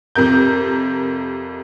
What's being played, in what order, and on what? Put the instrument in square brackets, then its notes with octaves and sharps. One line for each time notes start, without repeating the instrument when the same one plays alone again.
[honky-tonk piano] F2 C3 A#4 G6